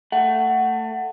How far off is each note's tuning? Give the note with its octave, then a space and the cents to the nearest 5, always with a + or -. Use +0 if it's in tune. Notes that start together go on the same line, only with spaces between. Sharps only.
A3 +20 F#5 +10